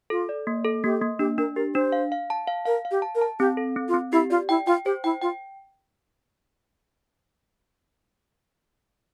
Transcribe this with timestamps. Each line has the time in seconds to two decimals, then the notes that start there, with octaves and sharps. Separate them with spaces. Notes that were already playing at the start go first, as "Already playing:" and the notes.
0.10 F4 A4
0.29 D5
0.47 A#3
0.65 A4
0.84 A#3 G4
1.02 A#3
1.19 D4 G4
1.38 D4 A#4
1.56 G4 A#4
1.75 D4 C5
1.92 F5
2.12 F5
2.30 A5
2.47 F5
2.66 A#4 F5
2.85 F5
2.91 G4
3.02 A5
3.15 A#4
3.21 A5
3.40 C4 G4
3.57 A4
3.76 C4
3.88 F4
3.94 C4
4.12 E4 G4
4.30 F4 D5
4.49 E4 G5
4.66 F4 G5
4.85 G4 C5
5.04 E4 G5
5.22 F4 G5